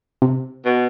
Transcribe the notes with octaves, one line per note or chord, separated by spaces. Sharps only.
C3
B2